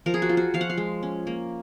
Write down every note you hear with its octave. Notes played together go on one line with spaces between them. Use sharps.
F3 A#4
G#4
F#4
F4
F#4
F3 F5
F#5
F5
G#3
C#4
A#3